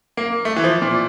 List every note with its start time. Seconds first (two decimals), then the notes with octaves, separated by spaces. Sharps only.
0.17 A#3
0.45 A3
0.56 E3
0.64 F3
0.82 A#2